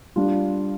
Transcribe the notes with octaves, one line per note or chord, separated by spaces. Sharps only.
G3 D4 F4